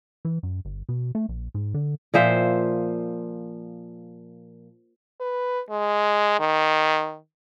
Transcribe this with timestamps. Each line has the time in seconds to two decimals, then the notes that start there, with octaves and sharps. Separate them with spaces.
0.25 E3
0.43 F#2
0.65 G1
0.89 B2
1.15 A3
1.29 A#1
1.55 G#2
1.74 D3
2.14 A#2 F3 C5 E5
5.20 B4
5.70 G#3
6.40 D#3